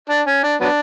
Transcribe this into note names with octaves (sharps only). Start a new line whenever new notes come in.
D4
C#4
D4
F#3 B3 D4